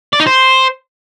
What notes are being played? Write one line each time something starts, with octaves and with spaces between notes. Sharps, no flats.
D5
D#4
C5